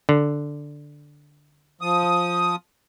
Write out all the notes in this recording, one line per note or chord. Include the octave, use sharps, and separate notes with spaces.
D3
F3 D#6